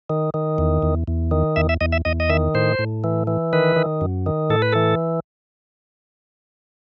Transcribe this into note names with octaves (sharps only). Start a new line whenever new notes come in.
D#3
D#3
E2
E2
E2
D#3
E2 E5
E5
E2 D#5
E5
E2 D#5
D#5
D#3 E5
A2 C5
A2
E3
E3
D#3 B4
D#3
F#2
D#3
A2 A4
B4
E3 A4